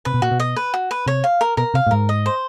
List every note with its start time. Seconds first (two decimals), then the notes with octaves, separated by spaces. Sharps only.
0.05 C3 B4
0.14 B2
0.22 A#2 F#4
0.31 B2
0.40 D#5
0.56 B4
0.74 F#4
0.91 B4
1.06 C3 C#5
1.24 F5
1.41 A#4
1.57 B2 A#4
1.74 C3 F5
1.87 A2
1.91 G#2 A#4
2.09 D#5
2.26 C5